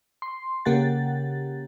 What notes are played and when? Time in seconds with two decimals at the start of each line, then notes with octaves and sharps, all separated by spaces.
0.22 C6
0.65 C#3 A#3 G4 F#5 A6